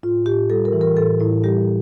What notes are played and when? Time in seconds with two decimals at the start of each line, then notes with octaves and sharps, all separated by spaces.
0.03 A2 F4
0.26 A2 G4
0.50 G3 A4
0.65 A#4
0.73 E3
0.81 A#4
0.97 A2 A4
1.20 A2 E4
1.44 G3 G4